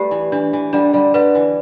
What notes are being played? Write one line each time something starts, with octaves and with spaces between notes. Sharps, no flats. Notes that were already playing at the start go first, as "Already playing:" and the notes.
Already playing: G3 A3 G4 B4
E3
E3 D4
E3
D3 G3 D4
D3 G3
D3 B4
E3